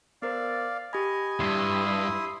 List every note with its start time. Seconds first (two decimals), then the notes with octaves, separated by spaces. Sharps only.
0.22 B3 A#4 C5 D5 F5
0.93 G4 D#5 G#5 B5
1.40 E2 G2 E4 C6 D#6